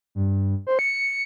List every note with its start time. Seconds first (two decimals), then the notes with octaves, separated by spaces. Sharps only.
0.15 G2
0.67 C5
0.79 C#7